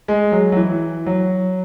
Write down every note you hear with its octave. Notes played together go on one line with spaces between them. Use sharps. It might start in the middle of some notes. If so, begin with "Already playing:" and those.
G#3
F#3
F#3
E3
F#3